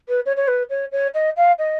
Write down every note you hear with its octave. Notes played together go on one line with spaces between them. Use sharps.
B4
C#5
C#5
B4
C#5
C#5
D#5
F5
D#5